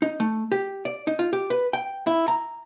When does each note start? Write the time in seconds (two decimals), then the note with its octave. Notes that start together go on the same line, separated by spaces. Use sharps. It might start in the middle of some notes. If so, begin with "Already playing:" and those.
0.02 D#4
0.20 A3
0.52 G4
0.85 D5
1.07 D#4
1.19 F4
1.33 G4
1.50 B4
1.73 G5
2.07 E4
2.28 A#5